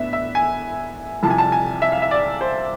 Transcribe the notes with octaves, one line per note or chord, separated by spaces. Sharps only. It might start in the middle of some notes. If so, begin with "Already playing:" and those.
Already playing: A2 B3 D4 E5
E5
G#5
C2 C3 F3 A5
G#5
A5
G#5
E5
F5
E5
D5
C5